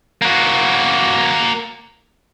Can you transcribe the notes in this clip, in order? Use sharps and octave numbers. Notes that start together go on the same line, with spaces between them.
A#3 F#4